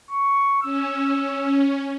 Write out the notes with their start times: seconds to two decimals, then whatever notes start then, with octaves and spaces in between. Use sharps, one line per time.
0.11 C#6
0.63 C#4 E6